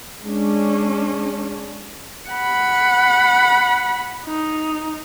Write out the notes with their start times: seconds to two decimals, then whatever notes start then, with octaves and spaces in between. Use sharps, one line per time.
0.24 G#3 C#4 D4
2.30 F#5 B5
4.26 D#4